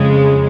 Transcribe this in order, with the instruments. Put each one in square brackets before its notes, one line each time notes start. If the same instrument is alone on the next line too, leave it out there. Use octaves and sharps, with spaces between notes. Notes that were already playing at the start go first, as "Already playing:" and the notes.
Already playing: [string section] F2 C#3 G#3